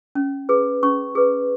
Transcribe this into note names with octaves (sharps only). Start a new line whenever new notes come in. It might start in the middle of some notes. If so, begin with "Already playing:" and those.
C#4
G#4 B4
C#4 C#6
G#4 B4